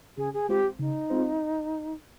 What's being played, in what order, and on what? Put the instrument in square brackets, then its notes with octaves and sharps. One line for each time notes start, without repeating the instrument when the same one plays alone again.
[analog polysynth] C#3 [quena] G#4
[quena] G#4
[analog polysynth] G#3 C4 F4 C5 [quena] G4
[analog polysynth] C#3 [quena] D#4
[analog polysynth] G#3 C4 F4 C5